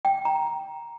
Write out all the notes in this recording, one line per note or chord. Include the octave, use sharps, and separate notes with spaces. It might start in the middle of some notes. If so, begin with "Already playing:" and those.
G5
A#5